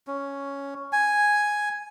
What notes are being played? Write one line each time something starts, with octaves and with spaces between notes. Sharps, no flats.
C#4
G#5